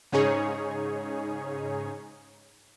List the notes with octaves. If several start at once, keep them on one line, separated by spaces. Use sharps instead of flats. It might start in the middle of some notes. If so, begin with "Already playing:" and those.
G#2 C#3 C#4 D#4 G#4 C#5